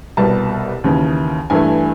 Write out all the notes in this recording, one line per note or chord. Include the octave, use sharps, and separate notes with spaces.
C2 B2 G3 B3 A5
D#2 C#3 E3
G2 E3 A3 G#5